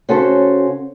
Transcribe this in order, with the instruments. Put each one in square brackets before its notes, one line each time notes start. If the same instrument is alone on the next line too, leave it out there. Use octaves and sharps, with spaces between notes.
[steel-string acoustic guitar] C#3 C#4 F#4 A4 C5